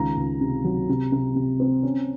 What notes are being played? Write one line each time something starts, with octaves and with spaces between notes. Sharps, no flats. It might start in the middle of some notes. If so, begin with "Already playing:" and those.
Already playing: C#2 D#3 A#5
C#2
C3
F#3
C3
C3
C3
C4
C#4